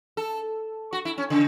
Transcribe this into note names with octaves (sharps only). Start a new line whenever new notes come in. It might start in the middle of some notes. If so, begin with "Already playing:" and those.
A4
F#4
E4
C#4
C#3